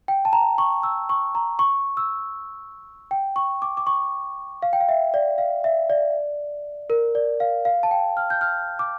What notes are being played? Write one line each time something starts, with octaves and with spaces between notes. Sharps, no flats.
G5
A5
A#5
C#6
E6
C#6
A#5
C#6
E6
G5
C#6
D6
D6
C#6
F5
G5
F5
E5
D5
F5
E5
D5
A#4
D5
F5
F5
A5
G5
F6
G6
F6
D6